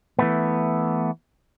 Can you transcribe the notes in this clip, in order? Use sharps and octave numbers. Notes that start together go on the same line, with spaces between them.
E3 A3 B3